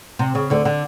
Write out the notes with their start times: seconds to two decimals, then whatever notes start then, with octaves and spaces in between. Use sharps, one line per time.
0.19 C3
0.35 C#3
0.50 D2 D3
0.65 D3